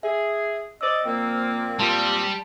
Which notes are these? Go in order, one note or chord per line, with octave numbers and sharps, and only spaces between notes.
G#4 E5
C5 D5 D#5 E6
A#2 F3 A#3 C4
A#2 G3 F4 A5 C6